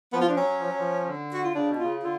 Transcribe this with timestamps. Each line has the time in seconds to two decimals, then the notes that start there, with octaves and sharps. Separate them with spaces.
0.13 F3 B3
0.21 F4
0.29 D4
0.36 F#3 C#4
0.60 F3
0.69 F#3
0.78 F3
1.07 D3
1.33 F#4
1.44 F4
1.55 C#3 D4
1.69 B2
1.78 C#3 F4
2.03 D3 F4